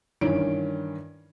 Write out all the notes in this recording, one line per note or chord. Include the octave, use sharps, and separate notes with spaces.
G2 D#3 E3 C#4 D7